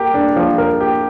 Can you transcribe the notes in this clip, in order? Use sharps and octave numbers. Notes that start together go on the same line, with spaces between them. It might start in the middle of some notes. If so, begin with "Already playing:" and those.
Already playing: G4 A#4
D4
F3
A#4
G4